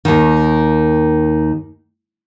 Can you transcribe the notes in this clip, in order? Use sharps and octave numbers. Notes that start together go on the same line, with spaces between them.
D#2 D#3